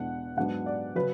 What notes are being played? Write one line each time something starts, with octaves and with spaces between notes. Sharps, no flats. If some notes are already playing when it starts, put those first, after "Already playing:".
Already playing: E2 B2 G#3 D4 F#5
G#2 F#3 B3 D4 F#5
D5
C#3 F#3 B4